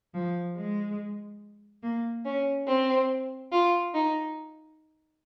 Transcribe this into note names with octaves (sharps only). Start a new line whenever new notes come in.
F3
G#3
A#3
C#4
C4
F4
D#4